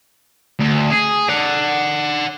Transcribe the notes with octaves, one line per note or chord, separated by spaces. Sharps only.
D2
G#4
D5 F#5